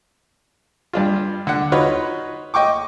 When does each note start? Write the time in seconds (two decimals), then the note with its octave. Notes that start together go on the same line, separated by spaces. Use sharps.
0.93 G2 D4 F4
1.47 D3 F#5
1.72 D#4 F4 F#4 B4 C#5
2.54 D#5 G5 C#6 D6